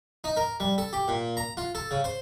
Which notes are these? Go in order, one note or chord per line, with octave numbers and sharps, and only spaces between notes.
D#4
A#4
G3
A4
G4
A#2
A#5
F4
A4
C#3
C5